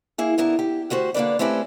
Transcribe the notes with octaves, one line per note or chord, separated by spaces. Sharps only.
A#3 E4 G#4
D3 B3 E4 A#4
G4
D2 F#4 G4 C5
D3 A#3 D4 B4 D5
A3 C4 C#4 E4 G4 B4